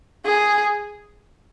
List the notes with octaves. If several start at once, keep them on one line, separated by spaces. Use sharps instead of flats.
G#4